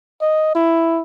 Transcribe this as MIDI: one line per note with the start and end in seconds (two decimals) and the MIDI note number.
0.21 0.55 75
0.55 1.02 64